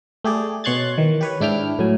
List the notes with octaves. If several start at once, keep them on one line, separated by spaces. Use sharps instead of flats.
A3 G4 G#4 D5
B2 C#5 C6 F#6 G#6 A6
D#3 E3
G4 B4 C#5
G#2 D4 E4 G5 F6
A2 F#3 G#5